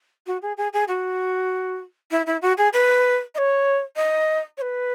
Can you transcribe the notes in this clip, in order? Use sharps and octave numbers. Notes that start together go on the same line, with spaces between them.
F#4
G#4
G#4
G#4
F#4
E4
E4
F#4
G#4
B4
D#5
C#5
D#5
C#5
B4